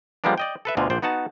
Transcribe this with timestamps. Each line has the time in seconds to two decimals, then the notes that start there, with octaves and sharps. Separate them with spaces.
0.24 F3 G3 G#3 A#3 B3 D4
0.38 D5 D#5 G5
0.65 A4 B4 E5
0.77 D2 B2 D3 F4
0.90 A#1 C5 D5
1.02 B3 D#4 F#4 F#5 A5